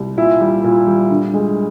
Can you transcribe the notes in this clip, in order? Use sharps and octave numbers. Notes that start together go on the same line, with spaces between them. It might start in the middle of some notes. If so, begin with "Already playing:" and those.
Already playing: C2
A#2 E4
G3
A#2
G3
D3
G#3